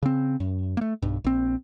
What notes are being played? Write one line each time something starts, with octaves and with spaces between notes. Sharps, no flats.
C#3 C4
F#2
A3 A#3
B1 G2
A#1 C4